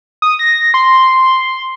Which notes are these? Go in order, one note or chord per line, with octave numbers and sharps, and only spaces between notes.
D#6
A#6
C6